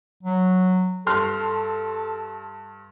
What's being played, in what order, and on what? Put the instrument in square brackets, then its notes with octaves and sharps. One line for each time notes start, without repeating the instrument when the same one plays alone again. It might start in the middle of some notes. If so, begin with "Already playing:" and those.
[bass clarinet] F#3
[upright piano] G2 C6 F6 [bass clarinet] A4